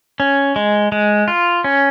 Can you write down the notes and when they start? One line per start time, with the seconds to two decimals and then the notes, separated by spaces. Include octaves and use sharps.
0.20 C#4
0.56 G#3
0.92 G#3
1.28 F4
1.64 C#4